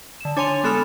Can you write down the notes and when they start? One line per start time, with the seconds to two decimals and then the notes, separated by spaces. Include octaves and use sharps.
0.20 D3 E7
0.37 D4 C#5 G#5 C6 D#7 F7
0.64 G#3 B3 A4 B5 F6 C#7